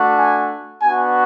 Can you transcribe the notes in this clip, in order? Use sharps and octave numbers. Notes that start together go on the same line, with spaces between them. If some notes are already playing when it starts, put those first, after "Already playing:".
Already playing: A3 D4 F#4
G#5
B3 D4 F#4 G#5